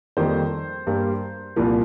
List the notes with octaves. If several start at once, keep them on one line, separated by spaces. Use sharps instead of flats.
F2 D#3 G3 A#3 C5
G2 G3 A#3
C2 A#2 F3 A#3